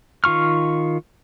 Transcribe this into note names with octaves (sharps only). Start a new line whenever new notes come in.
D#3 F4 C#6 F6